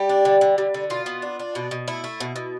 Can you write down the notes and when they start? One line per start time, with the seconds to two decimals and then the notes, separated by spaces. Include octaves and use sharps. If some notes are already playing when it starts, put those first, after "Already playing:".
Already playing: G3 G4
0.09 D4
0.25 D3
0.41 D3
0.58 G3
0.74 D3
0.90 B2 F4
1.06 B3
1.22 D4
1.39 D4
1.55 B2
1.71 B2
1.88 A3 E4
2.04 A3
2.20 B2
2.36 B2